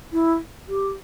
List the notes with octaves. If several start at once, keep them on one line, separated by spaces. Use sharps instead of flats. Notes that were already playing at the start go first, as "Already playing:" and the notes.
E4
G4